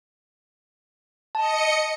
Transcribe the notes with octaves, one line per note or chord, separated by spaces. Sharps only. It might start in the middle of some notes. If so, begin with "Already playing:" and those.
D#5 A5 C#7